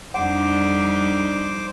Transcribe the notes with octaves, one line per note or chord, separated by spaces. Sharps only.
F2 G3 D4 D#4 C5 D5 F#5 D6